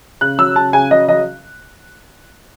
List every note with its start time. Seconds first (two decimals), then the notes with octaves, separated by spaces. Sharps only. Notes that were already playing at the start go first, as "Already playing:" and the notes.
0.21 C#3 F#6
0.39 F#3 E6
0.56 C#3 A5
0.73 C#3 G#5
0.91 F#3 D#5
1.08 F#3 D#5